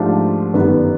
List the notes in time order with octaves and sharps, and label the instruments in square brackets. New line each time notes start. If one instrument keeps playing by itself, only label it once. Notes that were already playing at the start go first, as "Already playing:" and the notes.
Already playing: [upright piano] G#2 F3 A3 D4 G4
G1 F#2 D#3 G3 B3